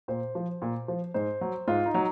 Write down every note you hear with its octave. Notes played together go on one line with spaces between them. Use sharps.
A#2 C5
F3
A#2
F3
G#2 C5
F#3
G#2 F4
D#4
F#3